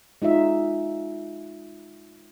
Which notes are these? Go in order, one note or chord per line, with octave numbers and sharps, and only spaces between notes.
G#3 D#4 F4 E5